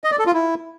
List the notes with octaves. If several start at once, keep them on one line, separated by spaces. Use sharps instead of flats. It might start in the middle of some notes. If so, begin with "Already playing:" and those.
D#5
D5
A4
F4
E4